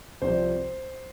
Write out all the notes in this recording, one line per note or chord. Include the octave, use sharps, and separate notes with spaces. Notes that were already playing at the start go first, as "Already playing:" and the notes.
C2 C3 F3 C5